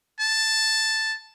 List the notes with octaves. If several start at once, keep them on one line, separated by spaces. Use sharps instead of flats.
A5